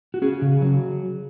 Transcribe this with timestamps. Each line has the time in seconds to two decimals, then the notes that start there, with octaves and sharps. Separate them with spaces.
0.14 F#4
0.22 C#4 G#4
0.42 C#3
0.61 F#3